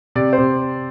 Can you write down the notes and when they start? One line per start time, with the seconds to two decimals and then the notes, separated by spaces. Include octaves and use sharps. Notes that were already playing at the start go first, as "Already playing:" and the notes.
0.15 C3 D5
0.33 C5
0.38 C3